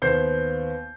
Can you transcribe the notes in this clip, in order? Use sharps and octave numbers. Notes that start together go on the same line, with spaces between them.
D#2 B3 C5 G6 C7